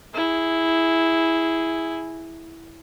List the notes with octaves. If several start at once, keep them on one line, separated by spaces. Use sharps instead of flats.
E4 G#4